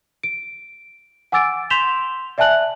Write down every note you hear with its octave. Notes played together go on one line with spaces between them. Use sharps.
D7
F#5 G#5 D6 E6 A6 D7
C6 G6 B6 E7 F7 G7
D5 E5 G#5 A5 F#6 F#7